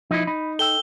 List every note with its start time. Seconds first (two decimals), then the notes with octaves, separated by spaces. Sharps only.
0.11 F3 D#4 E4
0.27 D#4 B5
0.59 A4 G5 E6 G7